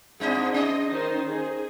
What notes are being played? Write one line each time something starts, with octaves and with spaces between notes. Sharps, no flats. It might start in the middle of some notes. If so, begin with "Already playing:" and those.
G#2 C4 D4 D#4 G#4 D#5
C#4 D#5
D#3 D#4 C5
G#4